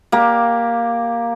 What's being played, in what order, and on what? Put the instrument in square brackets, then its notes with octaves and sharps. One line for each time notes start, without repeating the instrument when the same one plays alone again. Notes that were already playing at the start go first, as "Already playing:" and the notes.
[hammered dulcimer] A#3 G4